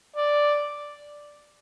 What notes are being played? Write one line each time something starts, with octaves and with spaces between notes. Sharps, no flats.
D5